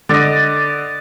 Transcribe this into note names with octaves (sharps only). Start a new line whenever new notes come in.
D3 D5 D#5